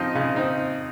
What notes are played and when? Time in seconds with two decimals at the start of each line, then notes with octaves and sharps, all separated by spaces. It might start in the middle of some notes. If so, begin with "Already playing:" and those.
Already playing: C#3 F3 C4 D#4 D#5
0.15 C#3
0.36 C4 D#4